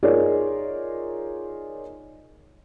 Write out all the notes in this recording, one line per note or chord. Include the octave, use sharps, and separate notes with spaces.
D#4 F4 G#4 A#4 C#5 D5